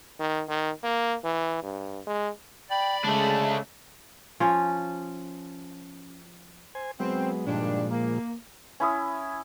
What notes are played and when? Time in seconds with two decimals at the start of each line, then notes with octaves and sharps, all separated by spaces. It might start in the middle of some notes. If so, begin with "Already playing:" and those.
0.20 D#3
0.48 D#3
0.83 A#3
1.24 E3
1.63 G2
2.07 G#3
2.70 D5 G5 B5
3.04 C#3 G#3 A3 D4 A5
4.40 F3 C#4
6.75 C5 G#5
7.00 F#3 G#3 B3 C4
7.47 G2 A#2 D#3 F3 G#3 D4
7.91 A#3
8.80 C#4 E4 D#6